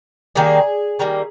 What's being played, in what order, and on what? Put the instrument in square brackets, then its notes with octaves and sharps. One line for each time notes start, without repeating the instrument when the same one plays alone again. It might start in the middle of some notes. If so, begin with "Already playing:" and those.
[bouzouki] D#3 G3 A#3 G#4
D#3 G3 A#3